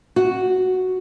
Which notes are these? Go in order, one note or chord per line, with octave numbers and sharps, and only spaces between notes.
F#4